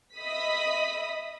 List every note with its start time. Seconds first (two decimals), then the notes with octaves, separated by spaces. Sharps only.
0.18 D#5 E5 B5 D#6 B6